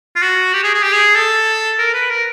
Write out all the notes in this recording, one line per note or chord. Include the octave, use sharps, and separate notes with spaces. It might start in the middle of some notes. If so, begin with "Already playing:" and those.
F4
F#4
G4
G#4
G#4
G4
G#4
A4
A#4
B4
A#4